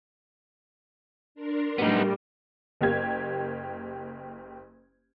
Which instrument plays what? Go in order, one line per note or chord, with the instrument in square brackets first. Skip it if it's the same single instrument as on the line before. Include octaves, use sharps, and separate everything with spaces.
[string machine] D4 A#4 C6
[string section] A2 G3 [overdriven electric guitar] B3 D#4
[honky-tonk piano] F#1 A#3 G4 G#6